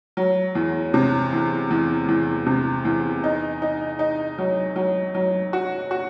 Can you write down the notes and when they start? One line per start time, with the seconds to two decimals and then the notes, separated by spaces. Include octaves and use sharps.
0.17 F#3
0.55 E2
0.94 C3
1.32 E2
1.70 E2
2.08 E2
2.46 C3
2.85 E2
3.24 D#4
3.62 D#4
3.99 D#4
4.38 F#3
4.76 F#3
5.15 F#3
5.53 F#4
5.91 F#4